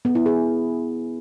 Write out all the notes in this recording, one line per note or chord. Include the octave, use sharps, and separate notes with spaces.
B3
E4
G#4